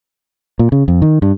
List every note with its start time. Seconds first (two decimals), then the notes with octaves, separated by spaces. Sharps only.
0.59 A#2
0.72 C#3
0.88 F2
1.02 D#3
1.22 G2